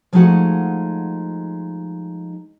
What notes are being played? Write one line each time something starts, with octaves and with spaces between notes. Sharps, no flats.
F3 G#3 A3 D#4 F#4 F#5